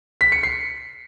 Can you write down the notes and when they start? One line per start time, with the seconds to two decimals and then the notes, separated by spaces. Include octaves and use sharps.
0.21 B6
0.32 C#7
0.43 C7